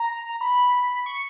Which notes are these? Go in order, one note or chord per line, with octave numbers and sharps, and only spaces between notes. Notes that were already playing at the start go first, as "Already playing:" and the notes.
Already playing: A#5
B5
C#6